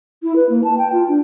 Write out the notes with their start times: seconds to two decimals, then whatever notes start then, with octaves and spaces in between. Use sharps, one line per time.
0.23 E4
0.36 B4
0.49 A#3
0.64 A5
0.78 G5
0.93 F4
1.09 D4